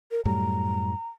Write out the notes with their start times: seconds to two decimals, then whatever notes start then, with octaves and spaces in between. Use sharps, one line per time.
0.11 A#4
0.25 F#2 A2 G3 A#5